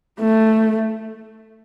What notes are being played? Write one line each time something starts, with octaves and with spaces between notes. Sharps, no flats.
A3